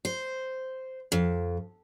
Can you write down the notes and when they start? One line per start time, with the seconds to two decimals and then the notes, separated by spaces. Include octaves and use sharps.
0.05 C5
1.12 F2